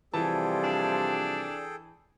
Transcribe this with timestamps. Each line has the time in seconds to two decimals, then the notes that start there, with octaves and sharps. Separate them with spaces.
0.14 C3 E3 F3 G3 G#4 A4 G5 A5
0.64 D4